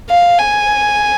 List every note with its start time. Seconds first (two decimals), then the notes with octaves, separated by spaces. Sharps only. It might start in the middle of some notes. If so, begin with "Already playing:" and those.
0.10 F5
0.39 G#5